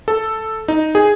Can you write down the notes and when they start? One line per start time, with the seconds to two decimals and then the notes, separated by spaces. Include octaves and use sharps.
0.08 A4
0.68 D#4
0.95 G#4